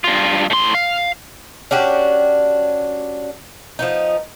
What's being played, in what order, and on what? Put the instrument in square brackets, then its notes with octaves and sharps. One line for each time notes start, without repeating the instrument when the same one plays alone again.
[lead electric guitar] G2 F4
A2 C6
F5
[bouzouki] C#4 D4 F#4 G4
F3 B3 D#4